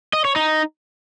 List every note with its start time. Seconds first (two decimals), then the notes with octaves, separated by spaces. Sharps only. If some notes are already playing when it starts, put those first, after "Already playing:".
0.13 D#5
0.25 C#5
0.36 D#4